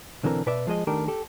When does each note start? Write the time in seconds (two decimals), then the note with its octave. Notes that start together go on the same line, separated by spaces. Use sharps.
0.23 B1 D3 E3 C4 A#4
0.46 B2 B4 D5 E5
0.67 F3 G#3 G#4 D#5
0.87 D#3 A3 D4 G4 A#4
1.08 G4 A4